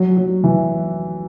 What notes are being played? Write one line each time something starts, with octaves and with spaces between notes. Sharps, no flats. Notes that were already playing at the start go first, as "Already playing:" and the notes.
Already playing: F#3
F#3
E3